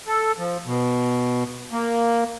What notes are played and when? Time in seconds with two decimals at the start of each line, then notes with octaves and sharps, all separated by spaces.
0.07 A4
0.38 F3
0.66 B2
1.72 A#3